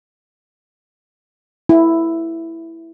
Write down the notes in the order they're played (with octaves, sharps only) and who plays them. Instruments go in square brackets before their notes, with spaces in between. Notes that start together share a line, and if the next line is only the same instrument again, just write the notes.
[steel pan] E4